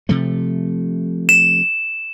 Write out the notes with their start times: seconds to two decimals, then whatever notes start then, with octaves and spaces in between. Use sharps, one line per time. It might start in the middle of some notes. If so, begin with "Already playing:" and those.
0.09 C3 F3 A3
1.29 E7